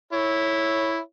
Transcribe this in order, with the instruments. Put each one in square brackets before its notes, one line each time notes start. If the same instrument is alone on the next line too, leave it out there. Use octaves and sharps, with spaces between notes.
[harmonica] E4 C#5